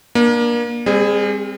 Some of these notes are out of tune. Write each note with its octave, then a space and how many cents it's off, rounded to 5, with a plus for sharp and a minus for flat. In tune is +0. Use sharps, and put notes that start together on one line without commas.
A#3 +30 D4 +10
G3 +40 C4 +0 G#4 +0